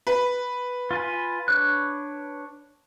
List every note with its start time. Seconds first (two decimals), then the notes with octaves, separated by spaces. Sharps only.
0.07 B4
0.91 F4 G#5 B5
1.48 D4 C#5 F#6